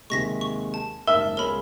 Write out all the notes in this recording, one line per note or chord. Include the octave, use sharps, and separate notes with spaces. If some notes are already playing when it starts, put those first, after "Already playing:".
D#2 C3 G#3 C#6 A#6 B6
C#6
A5
F#1 G#2 A#4 E5 A5
C#2 G#3 A#4 C#5 B5